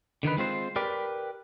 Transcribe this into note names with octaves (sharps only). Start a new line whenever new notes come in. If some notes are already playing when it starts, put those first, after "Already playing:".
D3 D#3 D#4 B4
G#3 C4 F4 C5
G4 A#4 B4 D5 G5